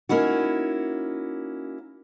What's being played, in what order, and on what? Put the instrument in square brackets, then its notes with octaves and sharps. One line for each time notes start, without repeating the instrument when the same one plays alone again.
[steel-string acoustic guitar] A#3 C#4 D#4 E4 F#4